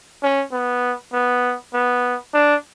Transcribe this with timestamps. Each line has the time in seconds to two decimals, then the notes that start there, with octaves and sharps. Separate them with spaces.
0.23 C#4
0.52 B3
1.13 B3
1.74 B3
2.34 D4